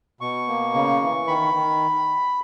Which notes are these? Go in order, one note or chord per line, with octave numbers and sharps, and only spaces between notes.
B2 C#6
A#3
C#3
E3
D#3 B5
D#3